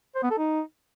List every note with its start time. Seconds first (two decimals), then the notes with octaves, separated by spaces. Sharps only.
0.15 C5
0.23 B3
0.31 A4
0.38 D#4